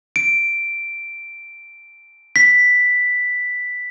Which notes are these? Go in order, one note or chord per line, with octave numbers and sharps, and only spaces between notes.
D7
B6